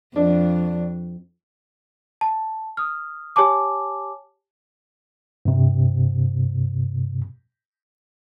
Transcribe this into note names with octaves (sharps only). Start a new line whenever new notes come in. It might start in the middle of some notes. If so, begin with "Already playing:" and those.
F2 D4
A5
D#6 F6
G4 C#5 G#5 A5 D6
G2 C3